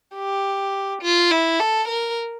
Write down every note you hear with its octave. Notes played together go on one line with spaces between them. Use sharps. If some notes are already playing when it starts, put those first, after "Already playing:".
G4
F4
E4
A4
A#4